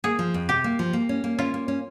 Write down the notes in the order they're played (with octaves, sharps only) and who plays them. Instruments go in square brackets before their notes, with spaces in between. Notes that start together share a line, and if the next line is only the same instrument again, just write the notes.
[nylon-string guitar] A#3 [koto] G#4
[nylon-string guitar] F3
F2
[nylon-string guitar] C3 [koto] G4
[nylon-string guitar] A#3
F3
A#3
C#4
A#3
[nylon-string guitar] C#4 [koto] F4
[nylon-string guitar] A#3
C#4